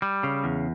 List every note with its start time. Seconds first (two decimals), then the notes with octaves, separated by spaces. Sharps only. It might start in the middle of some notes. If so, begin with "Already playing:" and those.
0.02 G3
0.23 C#3
0.44 E2